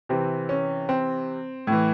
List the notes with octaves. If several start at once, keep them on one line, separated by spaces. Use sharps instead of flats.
C3 E3 C4
C#4
C4
A2 E3